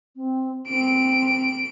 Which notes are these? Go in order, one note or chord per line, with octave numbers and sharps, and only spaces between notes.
C4
C4 D7